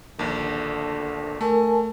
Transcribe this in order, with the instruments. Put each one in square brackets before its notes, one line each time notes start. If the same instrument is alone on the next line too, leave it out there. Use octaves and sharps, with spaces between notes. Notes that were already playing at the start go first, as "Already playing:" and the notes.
[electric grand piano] A#1 D#2 [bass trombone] D3
[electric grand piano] A3 [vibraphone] A#4 G#5 A5